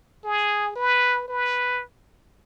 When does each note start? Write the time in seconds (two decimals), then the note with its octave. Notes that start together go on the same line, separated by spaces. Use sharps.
0.25 G#4
0.76 B4
1.28 B4